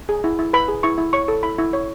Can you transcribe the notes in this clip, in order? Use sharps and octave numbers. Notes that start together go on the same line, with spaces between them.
G#4
E4
E4
B4 B5
G#4
E4 C#6
E4
C#5 C#6
A4
E4 B5
E4
C#5